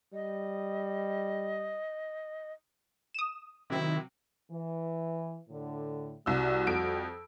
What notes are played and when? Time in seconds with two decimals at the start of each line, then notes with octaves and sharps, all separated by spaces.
0.13 G3 D#5
3.15 D#6 E7
3.70 C3 D#3 F#3 C4 E4
4.51 E3
5.49 A2 D3
6.26 C2 G3 F#4 E6
6.67 F2 D7